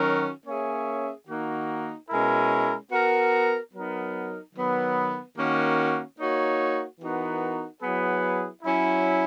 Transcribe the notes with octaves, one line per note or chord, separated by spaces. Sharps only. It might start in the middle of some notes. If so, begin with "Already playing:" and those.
Already playing: D#3 F#3 C#4 F#4 A#4
A#3 C#4 G#4 C#5 E5
D#3 A#3 D#4 F#4
B2 G#3 C#4 E4 A#4
B3 F#4 A#4
F#3 B3 D#4 A#4
D#3 F#3 B3
D#3 A#3 C#4 F#4
A#3 D#4 F#4 C#5
E3 B3 D#4 F#4 A#4
F#3 B3 E4 G#4 B4
F#3 C#4 E4